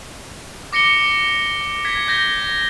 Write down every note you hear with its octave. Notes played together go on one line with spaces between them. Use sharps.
D6 A#6 C#7 D7 G7
G#6 B6 C#7
G6 A#6 G7